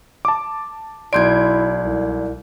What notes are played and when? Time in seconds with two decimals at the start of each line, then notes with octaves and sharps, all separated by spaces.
0.25 A5 D6
1.13 B1 E4 D5 C6 G6 G#6 D7
1.77 C2